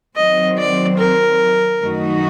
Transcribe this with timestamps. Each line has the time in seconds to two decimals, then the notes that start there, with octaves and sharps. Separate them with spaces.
0.16 D#3 F#3 C4 D#5
0.57 D5
0.98 A#4
1.80 F#2 D#3 A3 D#4 F#4